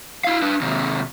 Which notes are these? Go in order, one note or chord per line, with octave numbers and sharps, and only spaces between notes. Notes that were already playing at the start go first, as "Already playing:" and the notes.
E4 F5
D4 B4
D#2 C3